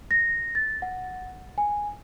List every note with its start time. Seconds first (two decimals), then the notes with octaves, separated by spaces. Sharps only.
0.11 A#6
0.55 A6
0.82 F#5
1.58 G#5